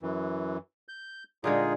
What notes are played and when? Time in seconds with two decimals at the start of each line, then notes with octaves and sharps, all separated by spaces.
0.03 F#2 E3
0.89 G6
1.44 A#2 D3 G#3 D#4 F4 G#4